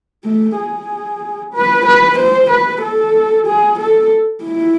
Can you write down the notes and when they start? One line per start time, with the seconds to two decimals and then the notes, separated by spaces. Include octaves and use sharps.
0.25 A3
0.56 G#4
1.53 B4
1.86 B4
2.18 C5
2.50 B4
2.82 A4
3.47 G#4
3.79 A4
4.43 E4